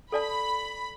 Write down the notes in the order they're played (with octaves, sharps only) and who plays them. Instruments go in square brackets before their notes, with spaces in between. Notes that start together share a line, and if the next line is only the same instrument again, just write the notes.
[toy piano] A4 D5 A5 [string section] B5